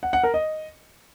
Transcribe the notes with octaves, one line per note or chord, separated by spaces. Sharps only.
F#5
F#5
A#4
D#5